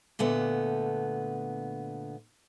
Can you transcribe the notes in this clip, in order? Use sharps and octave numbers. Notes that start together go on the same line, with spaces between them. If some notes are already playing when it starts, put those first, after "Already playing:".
A#2 D3 A3 B3